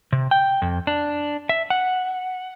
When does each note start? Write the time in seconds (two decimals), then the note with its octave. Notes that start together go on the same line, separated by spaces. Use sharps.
0.12 C3
0.31 G5
0.62 F2
0.87 D4
1.49 E5
1.70 F#5